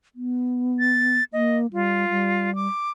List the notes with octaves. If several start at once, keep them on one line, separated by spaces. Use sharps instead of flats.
B3
A6
A#3 D#5
G3 F4
G3
D6